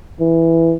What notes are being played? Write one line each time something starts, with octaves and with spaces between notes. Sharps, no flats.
E3